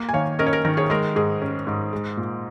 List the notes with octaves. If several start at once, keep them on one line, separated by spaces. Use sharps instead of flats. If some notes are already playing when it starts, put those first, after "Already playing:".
Already playing: A#3
G#5
D#3 C#5 F5
C#4 A#4 D#5
C#5
A#4
D#3 A#4
G#4 C#5
G#3 A#4
G#2 G#4
C#4
G#2
G#3
A#2